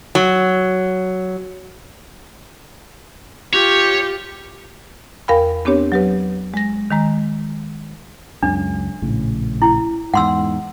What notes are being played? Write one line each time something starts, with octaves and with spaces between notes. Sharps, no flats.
F#3
F4 G4 C#5
E2 A#4 F5 G5 B5
B3 C4 D4 G4 C#5
F#3 G4 B4
G#3 A#6
D#3 G#3 A#5
C#2 F#2 C#3 D4
A#1 A2 C#3
E4
E2 G#2 F#5 C6 E6